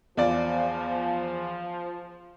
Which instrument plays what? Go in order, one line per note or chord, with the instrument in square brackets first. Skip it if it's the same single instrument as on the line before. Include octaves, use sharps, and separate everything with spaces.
[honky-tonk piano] E2 F4 D5 [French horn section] F3